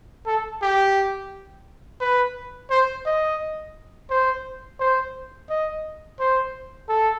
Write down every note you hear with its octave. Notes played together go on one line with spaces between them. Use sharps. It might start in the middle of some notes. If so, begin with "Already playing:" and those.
A4
G4
B4
C5
D#5
C5
C5
D#5
C5
A4